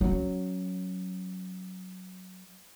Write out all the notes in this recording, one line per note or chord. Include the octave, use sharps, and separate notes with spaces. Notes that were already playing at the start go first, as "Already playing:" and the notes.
F#3 C#4